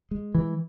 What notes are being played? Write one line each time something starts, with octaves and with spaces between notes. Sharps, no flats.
G#3
E3